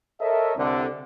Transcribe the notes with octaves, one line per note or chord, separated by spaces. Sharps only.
A4 A#4 C#5 D#5 E5
C2 D3